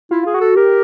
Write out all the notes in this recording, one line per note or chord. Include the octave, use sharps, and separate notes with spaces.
E4 F4
F4 G#4
F#4
A4
G4 A#4